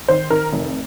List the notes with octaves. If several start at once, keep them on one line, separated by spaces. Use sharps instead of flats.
D#3 C5
D#3 A#4
F1